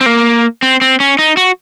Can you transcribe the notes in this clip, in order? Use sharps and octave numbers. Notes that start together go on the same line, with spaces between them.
C4
A#3
C4
C4
C#4
D#4
F#4